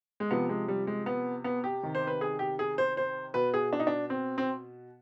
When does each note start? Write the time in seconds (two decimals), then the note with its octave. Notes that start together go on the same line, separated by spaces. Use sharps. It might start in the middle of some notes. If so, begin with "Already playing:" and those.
0.20 G#3
0.31 C3 F3 B3
0.49 G#3
0.68 G3
0.87 G#3
1.06 B3
1.44 B3
1.64 G4
1.83 C3 D#3
1.95 C5
2.07 B4
2.21 G#4
2.39 G4
2.59 G#4
2.78 C5
2.97 C5
3.34 B2 B4
3.54 G#4
3.73 D4
3.80 D#4
3.87 D4
4.10 C4
4.38 C4